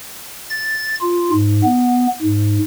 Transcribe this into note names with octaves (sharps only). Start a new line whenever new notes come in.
A6
F4
G#2
B3
G#2